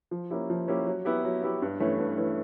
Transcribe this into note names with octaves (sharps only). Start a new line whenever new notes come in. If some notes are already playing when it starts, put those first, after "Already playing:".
F3
A#3 C#4 E4 G4
F3
A#3 C#4 E4 G4
F#3
B3 E4 G4
F#3
B3 E4 G4
G2
E3 A3 C#4 E4
G2
E3 A3 C#4 E4